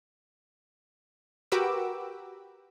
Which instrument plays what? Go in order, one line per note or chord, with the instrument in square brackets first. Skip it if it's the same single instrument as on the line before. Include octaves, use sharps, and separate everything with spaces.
[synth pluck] F#4 G4 A#4 B4 D6 E6